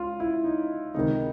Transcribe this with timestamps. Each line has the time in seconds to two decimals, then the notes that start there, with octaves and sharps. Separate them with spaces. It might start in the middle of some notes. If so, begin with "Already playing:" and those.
Already playing: C#2 F3 F4
0.20 E4
0.44 D#4
0.95 C#2 C3 D#3 D#4